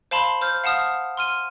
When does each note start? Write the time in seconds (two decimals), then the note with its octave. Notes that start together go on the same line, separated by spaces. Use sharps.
0.11 C5 F5 A5 B5 C6
0.41 C5 F6 G6
0.64 F5 F#5 A5 D#6 F6
1.17 C6 F6 D#7